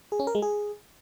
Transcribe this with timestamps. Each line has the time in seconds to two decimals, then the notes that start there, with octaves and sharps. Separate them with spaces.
0.12 G#4
0.20 C#4
0.27 A#4
0.35 G#3
0.42 G#4